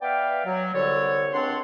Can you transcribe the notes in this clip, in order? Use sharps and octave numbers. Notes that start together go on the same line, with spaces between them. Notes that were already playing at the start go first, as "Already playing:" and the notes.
B3 B4 D5 E5 F5 G5
F#3
C2 D3 G3 C#5
C#2 C4 D4 C#5 F#5 C6